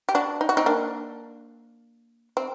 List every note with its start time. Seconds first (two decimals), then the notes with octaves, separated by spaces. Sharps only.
0.09 G4
0.15 D4 F#4
0.41 D#4
0.49 F#4
0.57 C4 D#4
0.66 A#3 D4
2.37 C4